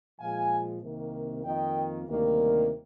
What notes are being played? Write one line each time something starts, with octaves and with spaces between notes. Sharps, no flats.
A#2 F3 G#3 F5 G#5
C2 C3 D#3 A#3
F2 D#3 A#3 D#5 G5
D2 C3 D#3 G3 A#3